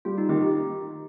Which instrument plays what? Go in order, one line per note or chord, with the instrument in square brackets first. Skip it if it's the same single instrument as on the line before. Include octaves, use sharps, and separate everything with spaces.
[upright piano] G3 [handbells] F4
[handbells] D#4
[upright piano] D#3 [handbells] G4
[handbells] G4